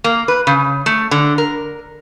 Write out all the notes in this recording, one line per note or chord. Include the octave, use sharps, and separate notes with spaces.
A#3
B4
C#3
A3
D3
A#4